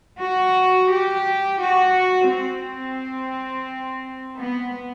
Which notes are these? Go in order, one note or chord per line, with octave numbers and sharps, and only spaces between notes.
F#4
G4
F#4
C4
B3